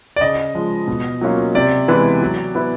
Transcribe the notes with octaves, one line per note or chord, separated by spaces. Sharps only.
D5
C#3 D#5
F3 G#3
B2
F#3 A#3 C#4 F4
C3 D5
E3 G#3 B3
F#3
B3 E4